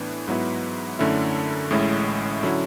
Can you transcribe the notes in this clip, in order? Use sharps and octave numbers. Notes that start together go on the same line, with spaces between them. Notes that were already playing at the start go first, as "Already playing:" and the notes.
Already playing: A2 E3 B3 D4
G#2 F#3 B3 E4
F#2 D3 A3 C#4 E4
A1 A2 G#3 C#4 E4
D3 F#3 C#4 E4